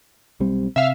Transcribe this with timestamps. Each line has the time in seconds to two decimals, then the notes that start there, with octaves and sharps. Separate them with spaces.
0.40 B1 G3 C4
0.76 C3 E5 F5